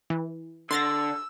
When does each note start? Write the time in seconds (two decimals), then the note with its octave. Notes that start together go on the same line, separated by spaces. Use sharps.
0.10 E3
0.71 D3 C6 E6 A6 A#6